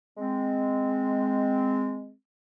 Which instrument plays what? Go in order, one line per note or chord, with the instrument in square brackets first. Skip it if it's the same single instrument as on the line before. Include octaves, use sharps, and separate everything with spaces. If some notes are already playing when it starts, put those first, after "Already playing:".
[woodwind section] G#3 C4